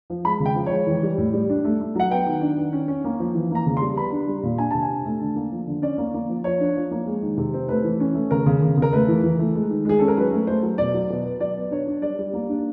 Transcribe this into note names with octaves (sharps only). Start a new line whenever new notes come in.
F3
G#3 B5
C#3
G5
F3
C#5
G#3
E3
G3
A2
G3
D4
A3
A3
F#3 F#5
B3 G5
D#3
D4
D#3
C#4
C#4
A#3
F3
E3
A#3 A#5
C#3
C6
G3
B3 B5
D4
G3
A#2
D4 G#5
C3 A5
G#5
D4
A3
D3
A#3
F3
D3
C#4 D5
A#3
A#3
F3
F3 C#5
D4
F3
A#3
G#3
D#3
C3
C4
A3 B4
E3
C#4
A3
C#3 A#4
C#3
C#3
C#3 A#4
A3 B4
E3
E3
A3
G#3
D#3
G#3 G#4
C#4 A4
A#4
F#3 B4
A3
A3 C5
F#3
B2 D5
F#3
B2
B3
F#3 D5
B3
D4 C#5
D4
G3 D5
G3
A#3
D4